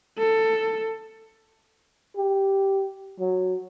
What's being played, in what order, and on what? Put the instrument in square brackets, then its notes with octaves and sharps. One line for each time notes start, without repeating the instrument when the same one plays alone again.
[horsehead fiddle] A4
[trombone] G4
F#3